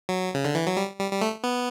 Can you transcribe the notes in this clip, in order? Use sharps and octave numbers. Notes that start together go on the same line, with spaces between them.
F#3
C#3
D3
E3
F#3
G3
G3
G3
A3
B3